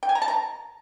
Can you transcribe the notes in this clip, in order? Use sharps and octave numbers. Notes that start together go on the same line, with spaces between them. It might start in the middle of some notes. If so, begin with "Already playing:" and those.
G5
G#5
A#5
A5
A#5